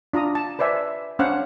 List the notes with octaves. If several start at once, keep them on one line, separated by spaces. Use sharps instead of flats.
D4 F4 A#5 D#6
A5
B4 C5 D5 E5 G#5
C#4 D4 C5 F5 F#5